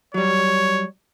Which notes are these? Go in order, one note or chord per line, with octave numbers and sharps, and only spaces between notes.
F#3 G3 C#5